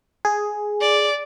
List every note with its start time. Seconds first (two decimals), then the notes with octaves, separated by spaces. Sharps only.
0.25 G#4
0.81 D5